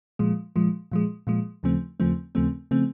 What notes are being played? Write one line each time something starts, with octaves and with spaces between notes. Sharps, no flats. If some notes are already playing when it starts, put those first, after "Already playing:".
A#2 F3 G#3
A#2 F3 G#3
A#2 F3 G#3
A#2 F3 G#3
D#2 C#3 F3 A3 C4
D#2 C#3 F3 A3 C4
D#2 C#3 F3 A3 C4
C#3 F3 A3 C4